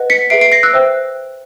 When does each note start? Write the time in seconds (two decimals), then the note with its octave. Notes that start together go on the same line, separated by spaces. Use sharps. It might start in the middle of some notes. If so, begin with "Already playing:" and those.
Already playing: B4 D#5 F#5
0.10 B6 C#7
0.30 G#4 B4 E5 C7 D7
0.41 C7 D7
0.52 A#6 C7
0.63 E6 F#6
0.73 C5 E5 G5